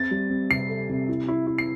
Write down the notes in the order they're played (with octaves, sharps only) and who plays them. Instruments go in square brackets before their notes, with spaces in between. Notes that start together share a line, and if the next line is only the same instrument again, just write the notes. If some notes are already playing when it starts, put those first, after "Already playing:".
Already playing: [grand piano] C4 [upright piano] A6
[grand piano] G3
C4
[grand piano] C3 [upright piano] C7
[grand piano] A4
C3
E4
E4
E4
[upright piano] C7